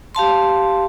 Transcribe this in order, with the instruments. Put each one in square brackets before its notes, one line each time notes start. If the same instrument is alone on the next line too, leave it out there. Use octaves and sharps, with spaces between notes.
[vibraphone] G4 F5 A5 C6